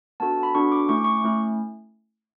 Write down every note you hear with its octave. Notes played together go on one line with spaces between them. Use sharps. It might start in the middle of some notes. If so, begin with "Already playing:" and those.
B3 D4 F#4 A4 A5
B5
B3 D4 F#4 A4 C#6
D6
A3 C#4 E4 C#6
D6
C#6
A3 C#4 E4